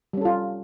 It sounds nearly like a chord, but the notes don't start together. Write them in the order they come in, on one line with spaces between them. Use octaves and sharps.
G3 C#4 A4 F4